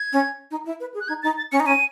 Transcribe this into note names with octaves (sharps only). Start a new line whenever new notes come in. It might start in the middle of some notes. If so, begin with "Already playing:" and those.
Already playing: G#6
C#4
D#4
E4
B4
G#4
F#6
D#4 G#6
D#4 A6
A6
C#4 C#7
D#4
C#4 D#7